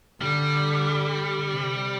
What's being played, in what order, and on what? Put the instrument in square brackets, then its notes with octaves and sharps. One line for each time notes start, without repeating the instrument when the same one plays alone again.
[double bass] D3 [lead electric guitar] G3
[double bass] C3